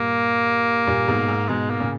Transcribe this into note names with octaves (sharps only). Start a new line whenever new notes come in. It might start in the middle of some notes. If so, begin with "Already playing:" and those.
Already playing: G2 A#2 A#3
G2 A#2
G#2 B2
G#2
G#2 B2 G#3
A#3
A#2 C#3